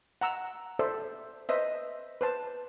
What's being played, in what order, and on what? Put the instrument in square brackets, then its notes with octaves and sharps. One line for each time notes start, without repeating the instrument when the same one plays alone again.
[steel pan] F#5 A#5 E6
A4 C5 D5 E5
B4 C5 D#5 E5
B4 C5 A5